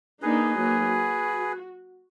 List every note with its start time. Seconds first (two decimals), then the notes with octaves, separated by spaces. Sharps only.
0.22 A#3 D4 D#4 G#4 B4
0.55 F#3 A#3
0.89 F#4